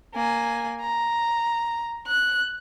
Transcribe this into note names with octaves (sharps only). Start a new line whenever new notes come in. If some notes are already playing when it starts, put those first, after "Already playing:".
A#3 G#5
A#5
F#6